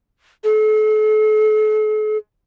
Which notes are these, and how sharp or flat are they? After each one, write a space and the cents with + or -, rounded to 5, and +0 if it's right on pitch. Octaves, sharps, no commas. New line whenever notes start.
A4 -40